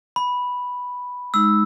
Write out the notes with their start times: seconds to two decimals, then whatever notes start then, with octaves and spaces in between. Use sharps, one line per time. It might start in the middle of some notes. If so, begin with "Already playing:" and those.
0.16 B5
1.34 G#3 D#4 E6